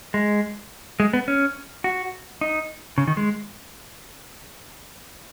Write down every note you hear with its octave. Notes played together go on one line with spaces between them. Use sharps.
G#3
G#3
B3
C#4
F#4
D#4
C#3
D#3
G#3